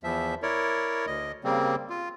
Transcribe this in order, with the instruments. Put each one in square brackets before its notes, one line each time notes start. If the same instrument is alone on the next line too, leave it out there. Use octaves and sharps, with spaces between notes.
[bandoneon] E2 F3 E5
E4 A#4 C#5 D5
D2 D#5
C#3 G3 A#3 C4
F4